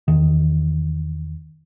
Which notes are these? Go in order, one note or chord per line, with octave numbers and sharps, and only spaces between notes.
E2 D#3